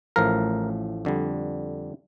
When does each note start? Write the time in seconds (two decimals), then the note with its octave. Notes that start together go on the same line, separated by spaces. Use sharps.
0.16 A1 A2 F3 A#4
1.05 F2 D3 G3